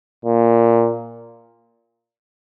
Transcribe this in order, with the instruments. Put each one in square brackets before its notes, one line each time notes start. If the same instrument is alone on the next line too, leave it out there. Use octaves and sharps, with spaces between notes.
[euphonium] A#2